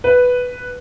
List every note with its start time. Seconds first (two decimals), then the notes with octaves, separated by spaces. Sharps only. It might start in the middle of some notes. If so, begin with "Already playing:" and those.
0.04 B4